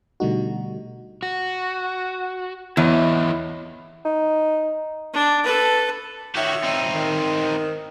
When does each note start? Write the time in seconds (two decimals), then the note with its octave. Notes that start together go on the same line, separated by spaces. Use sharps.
0.20 B2 D3 G3 A3 D#4 F#4
1.23 F#4
2.77 E2 E4 C#5 D#5
4.05 D#4
5.13 D4
5.44 A4 B4
6.36 D#3 F#4 G4 C#5 E5
6.64 C4 D#4
6.94 D#3